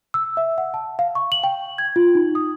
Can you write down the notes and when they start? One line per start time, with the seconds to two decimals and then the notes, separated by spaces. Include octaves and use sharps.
0.14 E6
0.37 E5
0.58 F#5
0.74 A5
0.99 F5
1.15 C#6
1.32 F#7
1.44 G5
1.78 G#6
1.96 F4
2.15 D#4
2.35 D#6